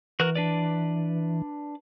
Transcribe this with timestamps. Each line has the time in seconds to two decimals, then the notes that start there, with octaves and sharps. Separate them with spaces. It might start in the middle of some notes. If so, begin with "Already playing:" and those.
0.20 E3 F#4 A#4 F#6
0.35 D4 B4 D5